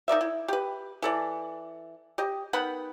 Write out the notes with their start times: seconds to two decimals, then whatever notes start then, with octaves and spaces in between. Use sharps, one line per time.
0.08 D#4 A#4 D5 E5
0.21 E4
0.48 G4 B4
1.02 E3 A4 D5
2.18 G4 D#5
2.53 D#3 B3 F#5 B5